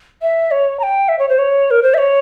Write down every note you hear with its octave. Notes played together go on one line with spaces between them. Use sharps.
E5
C#5
A#5
G5
E5
C#5
C5
C#5
A#4
C5
E5
C#5